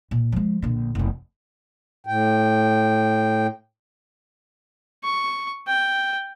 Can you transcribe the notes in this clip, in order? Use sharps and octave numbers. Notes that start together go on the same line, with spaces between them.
A#2
F3 G#3
A#1 D3
F1 E2
A2 G5
C#6
G5